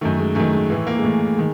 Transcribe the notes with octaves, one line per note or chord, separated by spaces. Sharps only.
F#2 D#3 A3
G#3
F#2 D#3 A3
G#3
A2 E3 A3
A#3
G#3
A2 E3 A3
D#3 G#3